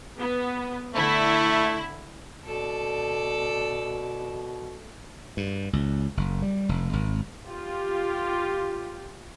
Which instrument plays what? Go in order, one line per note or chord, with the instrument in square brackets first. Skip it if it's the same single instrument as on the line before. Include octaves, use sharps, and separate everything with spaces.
[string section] B3
[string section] D3 E4 [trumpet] A3
[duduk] B2 [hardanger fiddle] A4 D5
[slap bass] G2
C#2
F#1
G3
F1
G#1
[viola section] F4 G4